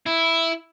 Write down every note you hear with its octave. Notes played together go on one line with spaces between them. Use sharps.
E4